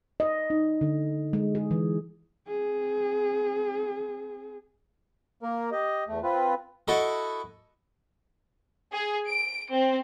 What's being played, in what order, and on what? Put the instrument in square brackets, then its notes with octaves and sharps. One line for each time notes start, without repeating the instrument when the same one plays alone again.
[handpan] D#5
D#4
D3
G#3
G#4
E3
[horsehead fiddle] C4 G#4
[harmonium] A#3 A#4
G4 D#5
E2 A3
C4 F4 B4
[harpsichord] E4 F#4 A4 D#5
[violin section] G#4
D7
C4